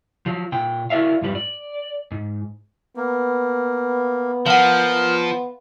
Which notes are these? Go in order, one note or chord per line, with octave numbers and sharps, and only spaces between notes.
F3 F#3
A#2 G5
E4 F#4 A#4 D5 E5 F5
F2 G#2 G3 B4
D5
G#2
A#3 B3
F3 A#4 F5 F#5